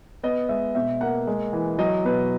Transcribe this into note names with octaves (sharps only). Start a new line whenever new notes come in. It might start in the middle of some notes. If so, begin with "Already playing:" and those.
B3 D#5
G#3 E5
B2 E5
A#3 F#5
G#3
E3
F#3 D#5
B2 B4